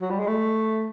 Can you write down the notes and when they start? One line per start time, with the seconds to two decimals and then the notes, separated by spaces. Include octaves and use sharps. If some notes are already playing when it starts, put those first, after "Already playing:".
0.01 F#3
0.11 G3
0.19 G#3
0.28 A3